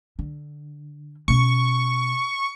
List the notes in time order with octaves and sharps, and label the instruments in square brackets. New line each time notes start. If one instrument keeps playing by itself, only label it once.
[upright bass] D3
[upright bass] B2 C#4 [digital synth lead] C#6